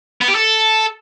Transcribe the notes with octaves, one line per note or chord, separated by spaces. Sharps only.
B3
G4
A4